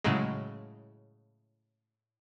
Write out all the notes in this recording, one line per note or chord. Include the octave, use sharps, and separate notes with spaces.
A2 C#3 F#3 G#3